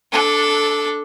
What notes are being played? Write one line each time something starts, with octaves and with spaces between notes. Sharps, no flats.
D4 A4